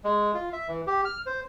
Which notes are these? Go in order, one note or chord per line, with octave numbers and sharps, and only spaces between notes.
G#3
F4
E5
E3
G4
F6
C5